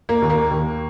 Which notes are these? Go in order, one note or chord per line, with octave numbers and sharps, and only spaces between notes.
A#3
D#2
A#3
D#2